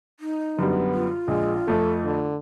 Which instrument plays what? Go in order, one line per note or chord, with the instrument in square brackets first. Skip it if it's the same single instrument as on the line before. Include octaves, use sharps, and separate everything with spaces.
[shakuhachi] D#4
[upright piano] F#2 D3 G3 [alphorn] B3
[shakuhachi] F4
[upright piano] A#1 [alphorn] G#3
[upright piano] F2 A3 [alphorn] A4
[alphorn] D3